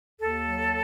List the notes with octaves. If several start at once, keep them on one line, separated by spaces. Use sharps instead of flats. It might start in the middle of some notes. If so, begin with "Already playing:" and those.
D#2 A4
F#3